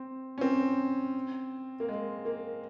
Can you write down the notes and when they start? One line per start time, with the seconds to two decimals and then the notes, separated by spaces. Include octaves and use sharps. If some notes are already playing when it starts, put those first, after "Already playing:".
Already playing: C4
0.38 C#4
0.41 C4
1.80 A#3
1.89 G#3
2.25 A#3